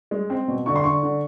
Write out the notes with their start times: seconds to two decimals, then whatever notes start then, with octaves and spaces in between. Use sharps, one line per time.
0.11 G#3
0.30 C4
0.48 B2
0.66 D3 C#6
0.76 C6
0.84 D3 C#6
1.03 D3